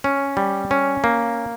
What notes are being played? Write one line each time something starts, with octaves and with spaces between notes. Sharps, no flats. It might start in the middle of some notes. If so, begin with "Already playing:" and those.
C#4
G3
C#4
A#3